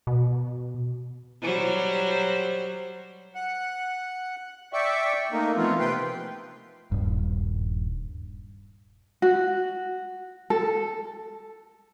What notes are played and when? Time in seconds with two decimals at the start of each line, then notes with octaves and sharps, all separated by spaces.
0.07 B2
1.42 F#3 G3 C5
3.35 F#5
4.73 D5 E5 G5 C#6
5.32 A3 A#3 D#4
5.56 E3 F3 A3 B3 C4 F4
5.79 C3 B4 G5 C6
6.92 D#1 G2
9.22 F#4
10.50 A4